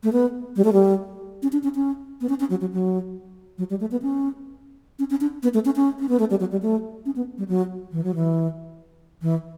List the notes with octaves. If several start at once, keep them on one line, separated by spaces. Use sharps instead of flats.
A3
B3
G3
A3
G3
C#4
D4
C#4
C#4
B3
C#4
C#4
F#3
F#3
F#3
F#3
G3
A3
B3
C#4
C#4
C#4
D4
B3
A3
C#4
C#4
C#4
B3
A3
G3
F#3
G3
A3
C#4
B3
G3
F#3
E3
F#3
E3
E3